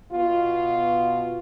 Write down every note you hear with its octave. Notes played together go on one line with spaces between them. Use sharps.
B2 F4